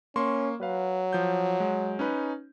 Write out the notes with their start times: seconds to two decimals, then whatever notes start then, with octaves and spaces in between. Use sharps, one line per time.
0.16 A#3 C#4 C6 C#6
0.61 F#3 B4 F5
1.13 F3 G6
1.60 G#3
1.99 C#4 D#4 B4